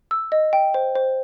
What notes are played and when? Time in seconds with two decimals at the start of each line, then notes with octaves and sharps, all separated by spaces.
0.11 E6
0.32 D#5
0.53 G5
0.74 C5
0.95 C5